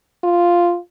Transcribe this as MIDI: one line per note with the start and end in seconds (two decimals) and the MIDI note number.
0.24 0.78 65